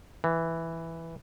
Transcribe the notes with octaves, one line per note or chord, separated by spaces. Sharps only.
E3